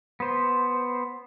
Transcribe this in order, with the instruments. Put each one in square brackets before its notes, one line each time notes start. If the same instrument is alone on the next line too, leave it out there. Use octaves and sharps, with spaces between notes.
[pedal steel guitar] B3 C5